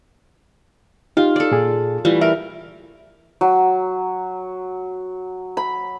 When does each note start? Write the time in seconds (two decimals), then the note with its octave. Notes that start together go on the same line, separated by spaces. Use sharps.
1.17 D#4 F4 G4
1.36 A4 D5
1.51 A#2 G#4
2.05 E3 G3 A3 F4
2.21 A#4 E5
3.41 F#3
5.57 B5